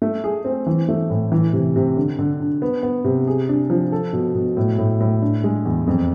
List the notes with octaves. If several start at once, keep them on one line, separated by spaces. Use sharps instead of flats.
A3
G#4
C4
E3
A3
A2
E3
C3
C3
D3
D3
D4
B3
B3
C3
G#4
D4
F3
A4
B2
B2
A2
A2
A2
D4
G#3
E2
F2